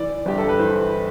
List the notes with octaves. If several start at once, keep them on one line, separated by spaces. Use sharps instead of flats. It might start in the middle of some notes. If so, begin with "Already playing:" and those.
Already playing: E3 D5
G1 G4
A4
B4
E3 C5